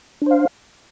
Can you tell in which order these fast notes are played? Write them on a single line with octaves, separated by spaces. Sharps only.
D4 C5 F5